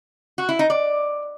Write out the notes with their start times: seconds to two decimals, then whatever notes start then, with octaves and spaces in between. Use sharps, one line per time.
0.38 F#4
0.49 E4
0.59 D#4
0.70 D5